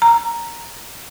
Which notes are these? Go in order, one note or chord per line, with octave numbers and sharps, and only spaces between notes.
A#5